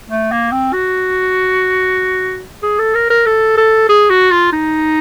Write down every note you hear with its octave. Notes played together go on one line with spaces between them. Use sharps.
A3
A#3
C4
F#4
G#4
A4
A#4
A#4
A4
A4
G#4
F#4
F4
D#4